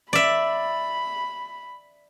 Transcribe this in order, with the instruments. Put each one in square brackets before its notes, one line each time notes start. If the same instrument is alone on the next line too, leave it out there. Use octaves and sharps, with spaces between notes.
[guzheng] D5 E5 [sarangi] B5